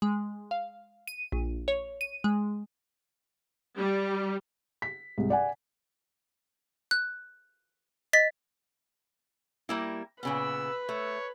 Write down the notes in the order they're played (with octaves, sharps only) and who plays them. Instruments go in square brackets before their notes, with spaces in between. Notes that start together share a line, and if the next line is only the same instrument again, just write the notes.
[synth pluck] G#3
F5
D#7
A#1
C#5
D#7
G#3
[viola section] G3
[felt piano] B6
C2 G#2
D5 F#5 G#5
[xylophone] F#6
D#5 A6 B6
[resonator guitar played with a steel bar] G3 A#3 E4
[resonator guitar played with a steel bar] A#2 C#3 B3 [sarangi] B4 [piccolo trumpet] E6
[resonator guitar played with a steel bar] A3 [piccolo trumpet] C#5